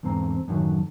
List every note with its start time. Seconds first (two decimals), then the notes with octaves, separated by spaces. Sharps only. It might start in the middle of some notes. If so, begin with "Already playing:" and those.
0.03 E2 G#2 D3 C4 A#5
0.48 F#2 A2 D3 D#3 F#3